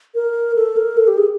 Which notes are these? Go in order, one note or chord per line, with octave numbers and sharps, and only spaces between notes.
A#4
A4
A#4
A4
G4
G#4